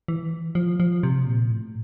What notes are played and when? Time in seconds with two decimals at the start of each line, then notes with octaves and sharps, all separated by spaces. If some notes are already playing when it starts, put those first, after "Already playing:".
0.08 E3
0.55 F3
0.80 F3
1.03 C3
1.27 A#2
1.50 A2